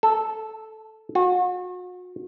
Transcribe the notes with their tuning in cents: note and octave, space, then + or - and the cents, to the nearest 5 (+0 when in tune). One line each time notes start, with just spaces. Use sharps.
A4 -5
F#4 -40